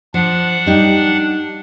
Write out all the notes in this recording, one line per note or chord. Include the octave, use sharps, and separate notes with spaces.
F3 D4 F#5
G3 D#4 G4